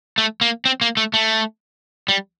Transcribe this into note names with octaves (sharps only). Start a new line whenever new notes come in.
A3
A#3
C4
A#3
A3
A3
G3